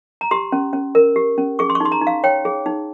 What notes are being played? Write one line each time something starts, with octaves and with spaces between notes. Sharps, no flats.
A#5
G4 C6
C#4
C#4
A#4
G4
C#4
G#4 C#6
C6
C#6
D#4 C6
A#5
D#4
F5
C#5 G5
G#4
D#4